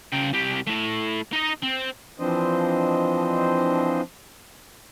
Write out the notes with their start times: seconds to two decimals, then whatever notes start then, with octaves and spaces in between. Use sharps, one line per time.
0.13 C#3 G5
0.34 C2 G4
0.67 A3 E4
1.33 D#4 D#5
1.63 C4
2.19 E3 F3 C4 D4 C5 D#5